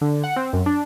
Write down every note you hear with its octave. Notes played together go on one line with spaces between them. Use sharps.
D3
F#5
C4
F#2
D4